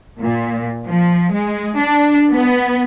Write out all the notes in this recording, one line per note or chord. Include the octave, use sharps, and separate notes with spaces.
A#2
F3
G#3
D4
B3